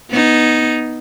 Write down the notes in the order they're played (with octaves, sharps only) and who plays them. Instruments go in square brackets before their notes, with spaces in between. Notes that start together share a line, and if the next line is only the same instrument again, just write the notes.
[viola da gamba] B3 D#4